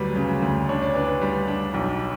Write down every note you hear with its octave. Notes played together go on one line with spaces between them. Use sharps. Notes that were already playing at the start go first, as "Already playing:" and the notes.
Already playing: D2 F#3 G3 B4
C#3
D2
D4 C#5
D5
D4 B4
B4
G3
D4
B1